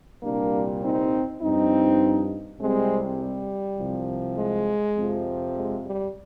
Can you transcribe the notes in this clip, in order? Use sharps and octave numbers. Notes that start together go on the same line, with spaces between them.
C2 A#2 G3 A#3 D4
C4 D#4
G2 F3 C4 D#4
C2 C3 G3 G#3 C4
G3
C2 C3 F3
G#3
F2 C3 F3
G#3
G3